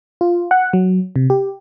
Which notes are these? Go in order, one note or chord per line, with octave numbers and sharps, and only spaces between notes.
F4
F#5
F#3
C3
G4